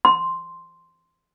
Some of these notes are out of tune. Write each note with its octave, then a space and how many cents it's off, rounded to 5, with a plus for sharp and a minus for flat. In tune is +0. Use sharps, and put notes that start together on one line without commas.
C6 +0